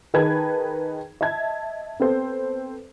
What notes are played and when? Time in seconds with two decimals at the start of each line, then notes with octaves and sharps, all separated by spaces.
0.14 D#3 D#4 G#4 B4 A5 G#6
1.21 D#5 E5 A5 G#6
2.00 B3 C4 A4 C5